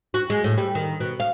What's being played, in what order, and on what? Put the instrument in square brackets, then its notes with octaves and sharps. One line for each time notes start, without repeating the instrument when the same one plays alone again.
[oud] F#4
G#3
A2
G3
D#3
B2
F5